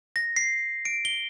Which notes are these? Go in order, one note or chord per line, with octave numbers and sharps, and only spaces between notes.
A#6
C7
D7
G7